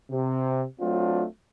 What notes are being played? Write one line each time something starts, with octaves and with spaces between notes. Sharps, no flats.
C3
F#3 A3 C4 D4 F4